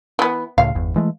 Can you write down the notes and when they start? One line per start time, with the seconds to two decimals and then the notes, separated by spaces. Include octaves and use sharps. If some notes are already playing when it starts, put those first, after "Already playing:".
0.19 E3 B3
0.58 C#2 A2 F5
0.75 G1 E2
0.96 E3 G#3 A3